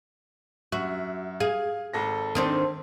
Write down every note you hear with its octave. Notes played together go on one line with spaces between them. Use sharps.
F#2 F#4 E5
G#4 F5
G#1 A4 A#6
D#3 C4 D4